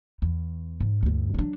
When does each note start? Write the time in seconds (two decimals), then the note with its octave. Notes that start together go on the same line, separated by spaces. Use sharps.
0.22 E2
0.80 G#2
1.03 D2 G2
1.34 F#3 D4